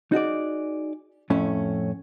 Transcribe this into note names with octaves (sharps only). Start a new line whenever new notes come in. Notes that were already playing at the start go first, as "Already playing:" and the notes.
D#4 F#4 G#4 D5
F2 A2 A3 C#4